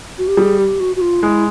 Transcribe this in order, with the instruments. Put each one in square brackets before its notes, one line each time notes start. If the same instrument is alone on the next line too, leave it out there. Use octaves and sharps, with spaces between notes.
[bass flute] F#4
G4
[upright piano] G3 [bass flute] G#4
[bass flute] G4
F#4
F#4
F4
[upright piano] G#3 [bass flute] E4